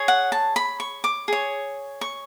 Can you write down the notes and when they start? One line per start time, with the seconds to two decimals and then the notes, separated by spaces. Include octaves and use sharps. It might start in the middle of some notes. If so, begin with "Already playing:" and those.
Already playing: G#4 C#5
0.08 F#5
0.32 A5
0.56 B5
0.80 C#6
1.04 D6
1.28 G#4 C#5
2.01 C#6